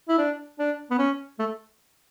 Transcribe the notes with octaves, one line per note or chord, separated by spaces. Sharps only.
E4
D4
D4
B3
C#4
A3